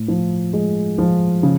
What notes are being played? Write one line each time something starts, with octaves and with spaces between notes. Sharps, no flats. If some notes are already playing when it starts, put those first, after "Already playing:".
Already playing: A2
F3
G#3
F3
C#3